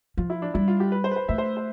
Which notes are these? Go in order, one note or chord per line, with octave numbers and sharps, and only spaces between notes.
F3 F4
E4
D4
G3 E4
F4
G4
B4
C5
B4
C5
A3 E5
C5
C5